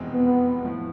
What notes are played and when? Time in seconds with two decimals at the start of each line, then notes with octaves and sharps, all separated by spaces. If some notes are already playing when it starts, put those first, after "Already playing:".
Already playing: F1 E2 B2 G#3 C4
0.13 B3
0.64 A2 F3 A3